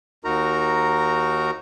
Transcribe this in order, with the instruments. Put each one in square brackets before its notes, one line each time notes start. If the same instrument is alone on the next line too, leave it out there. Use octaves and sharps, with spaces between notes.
[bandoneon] D#2 D#4 F#4 A#4 A#5